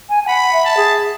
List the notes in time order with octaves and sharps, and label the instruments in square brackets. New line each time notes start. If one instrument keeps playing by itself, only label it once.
[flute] G#5
G#5
[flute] F#5 [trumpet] B5
[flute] E5
[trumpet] A5
[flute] G#4